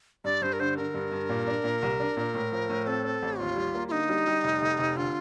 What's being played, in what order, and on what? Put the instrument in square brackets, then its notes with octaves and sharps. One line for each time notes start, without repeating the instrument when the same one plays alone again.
[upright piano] G2 [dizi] D5
[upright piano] G2 [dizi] C5
[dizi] A#4
[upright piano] D3 [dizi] C5
[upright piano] D3 [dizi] A#4
[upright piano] G2
G2
A#2
D4
A#2
C2
D4
A#2
A2
F3
A2
[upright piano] C4 [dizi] A4
[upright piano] C4
A1
[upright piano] D#2 [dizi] F4
[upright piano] G3
A#3
[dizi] F4
[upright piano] D3 [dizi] D#4
[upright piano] G3
G3
F1
F1
F1
[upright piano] D3 [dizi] F4